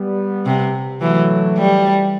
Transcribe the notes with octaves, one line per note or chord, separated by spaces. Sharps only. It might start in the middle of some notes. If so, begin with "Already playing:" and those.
Already playing: G3 B3
C3
E3 F#3 A3
G3